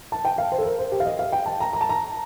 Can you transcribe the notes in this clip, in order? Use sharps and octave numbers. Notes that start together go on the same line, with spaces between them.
A5
G5
F5
C5
A4
A#4
C5
G4
F5
D#5
F5
G5
A5
A#5
A#5
A5
A#5